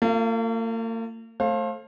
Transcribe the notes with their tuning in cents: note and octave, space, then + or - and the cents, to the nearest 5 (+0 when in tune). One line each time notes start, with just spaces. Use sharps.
A#3 -45 F4 +0
A3 +0 C5 +35 F5 +0